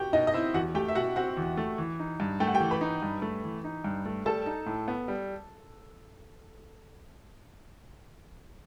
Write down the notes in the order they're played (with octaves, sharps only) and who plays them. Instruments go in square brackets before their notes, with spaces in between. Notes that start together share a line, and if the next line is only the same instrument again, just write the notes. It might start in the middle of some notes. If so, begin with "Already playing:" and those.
Already playing: [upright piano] F#4 G4 G5
[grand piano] B2 [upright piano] D#4 D#5
[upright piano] D#5
[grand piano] C4 [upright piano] E4 E5
[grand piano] E2 [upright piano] F#4 F#5
[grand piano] A3 [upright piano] G4 G5
[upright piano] E5
[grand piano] B2 [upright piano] F#4 F#5
[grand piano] C4 [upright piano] F#4 F#5
[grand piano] E2
A3
E3
D#4
G2
[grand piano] A3 [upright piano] G5
[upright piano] F#5
G4 G5
[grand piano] E3
[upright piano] B4 B5
[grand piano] D#4
G2
A3
E3
D#4
G2
A3
[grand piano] G3 [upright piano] A4 A5
[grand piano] D#4
A2
B3
G3